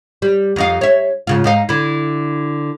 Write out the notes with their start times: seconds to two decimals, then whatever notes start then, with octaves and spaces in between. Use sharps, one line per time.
0.22 G3
0.56 F2 D#4 F5
0.81 C#5 E5
1.27 G#2 C#3 F4
1.44 G#2 D#4 F5
1.69 D3 E4